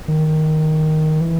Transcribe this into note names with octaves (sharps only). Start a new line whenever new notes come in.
D#3
E3